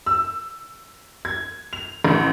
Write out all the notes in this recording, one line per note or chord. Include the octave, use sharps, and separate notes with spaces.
E6
G#6
F7
A1